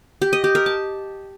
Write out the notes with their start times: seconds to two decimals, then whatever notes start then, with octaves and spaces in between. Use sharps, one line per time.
0.22 G4
0.33 D#5
0.44 G4
0.55 A#4
0.66 A5